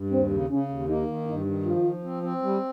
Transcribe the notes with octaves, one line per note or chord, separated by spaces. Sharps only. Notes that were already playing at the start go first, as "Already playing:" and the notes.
Already playing: G2
D#2 C4
C#3
C#3 C#4
D#2
A#3 D#4
D#3
G2 D#4
D#3
F3 F4
F3
C4
C4
G3